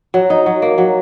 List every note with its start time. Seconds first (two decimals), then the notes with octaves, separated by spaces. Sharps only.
0.14 F#3
0.30 D#4
0.46 F#3
0.62 A#3
0.78 F#3